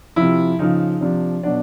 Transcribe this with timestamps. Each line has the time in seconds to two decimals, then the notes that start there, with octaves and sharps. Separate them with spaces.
0.16 C3 F3 E4
0.59 C#3 F3 D#4
1.01 C3 F3 D4
1.43 B2 F#3 D4